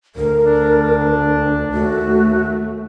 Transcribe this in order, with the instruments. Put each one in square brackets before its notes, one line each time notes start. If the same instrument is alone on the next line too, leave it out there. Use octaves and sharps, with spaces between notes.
[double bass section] D2 [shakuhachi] A#4
[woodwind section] D4
[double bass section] D#2 A3 [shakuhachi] F#4